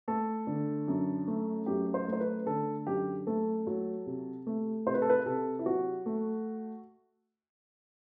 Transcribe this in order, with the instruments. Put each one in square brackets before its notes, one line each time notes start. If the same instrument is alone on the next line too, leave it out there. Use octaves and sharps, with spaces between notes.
[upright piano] A3 A4
D3
F#2
A3
F#2 G4
C5
A3
C5
B4
D3 A4
F#2 G4
A3 A4
F#3
C3
A3
C3 C5
B4
A4
B4
C3 A4
E4
F#3 F#4
A3